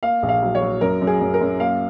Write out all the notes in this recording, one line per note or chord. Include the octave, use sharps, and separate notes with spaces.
A#3 F5
A#1
F5
F#3
C#5
F#3
F#2 A#4
F#2
G#4
F#2
A#4
F#2
A#3 F5